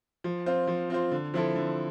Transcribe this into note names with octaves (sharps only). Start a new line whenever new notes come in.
F3
C4 F4 C5
F3
C4 F4 C5
D3
F3 C4 E4 A4
D3